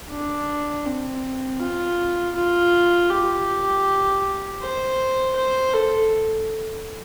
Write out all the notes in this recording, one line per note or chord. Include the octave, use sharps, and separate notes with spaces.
D4
C4
F4
F4
G4
C5
C5
A4